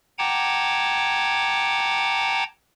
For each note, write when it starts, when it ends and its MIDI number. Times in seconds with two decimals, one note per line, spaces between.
0.19 2.44 78
0.19 2.44 79
0.19 2.44 81
0.19 2.44 82
0.19 2.44 86
0.19 2.44 92